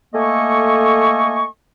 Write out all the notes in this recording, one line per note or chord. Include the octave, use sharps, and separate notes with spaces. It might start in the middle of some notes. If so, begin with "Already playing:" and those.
A3 A#3 A4 D#5 G#5 C#6